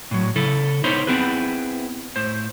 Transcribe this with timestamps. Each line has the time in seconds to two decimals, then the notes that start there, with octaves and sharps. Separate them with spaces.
0.11 A2 F#3
0.36 C#3 E4 A4
0.84 B3 D#4 E4 C5 C#5
1.07 B3 C4 E4 G#4 B4
2.16 A2 C5